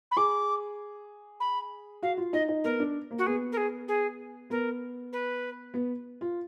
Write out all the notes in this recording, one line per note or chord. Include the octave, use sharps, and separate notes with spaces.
B5
G#4 D6
B5
F#4 F5
F4
D#4 D#5
D#4
B3 A#4
D4
A#3
F#4
B3 G#4
A#4
G#4
G#4
B3 A#4
B4
B3
F4